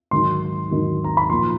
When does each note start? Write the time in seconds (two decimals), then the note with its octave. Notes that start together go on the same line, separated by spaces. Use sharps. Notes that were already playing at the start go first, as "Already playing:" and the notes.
0.11 G#2 D#3 F#3 C6
0.71 G#2 D#3 F#3
1.04 A#5
1.17 B5
1.30 A#2 F3 C6